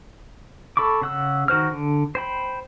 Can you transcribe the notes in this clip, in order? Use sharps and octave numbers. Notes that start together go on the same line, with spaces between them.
A4 B5 C#6 D6
C#3 F#5 E6
D#3 F#4 C5 F6
D3
C5 G5 B5